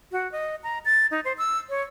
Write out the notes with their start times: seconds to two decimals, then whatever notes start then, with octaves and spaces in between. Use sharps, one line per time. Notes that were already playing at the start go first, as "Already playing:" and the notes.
0.12 F#4
0.32 D#5
0.63 A#5
0.85 A6
1.11 D#4
1.25 C5
1.38 E6
1.69 C#5